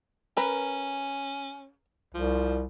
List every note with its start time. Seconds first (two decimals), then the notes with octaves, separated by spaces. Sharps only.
0.37 C#4 A#4 B4
2.14 C2 F3